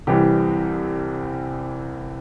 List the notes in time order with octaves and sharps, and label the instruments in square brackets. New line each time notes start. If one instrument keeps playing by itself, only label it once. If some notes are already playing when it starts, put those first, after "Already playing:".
[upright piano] C2 C3 E3 G3 G4